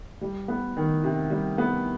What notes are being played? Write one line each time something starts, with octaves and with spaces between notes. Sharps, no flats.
G3
B3
D#3
C3
G3
B3